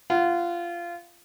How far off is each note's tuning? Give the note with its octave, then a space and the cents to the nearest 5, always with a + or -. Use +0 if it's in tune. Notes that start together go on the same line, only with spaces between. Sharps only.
F4 -20 F#5 +0